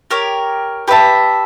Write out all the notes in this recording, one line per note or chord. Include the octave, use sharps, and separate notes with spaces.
G4 A#4 C#5
G4 B4 E5 A5